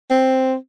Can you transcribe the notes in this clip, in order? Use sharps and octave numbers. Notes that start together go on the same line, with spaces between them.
C4